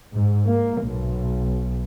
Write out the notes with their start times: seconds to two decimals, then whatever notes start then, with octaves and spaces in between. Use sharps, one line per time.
0.11 G#2
0.48 A#3
0.85 B1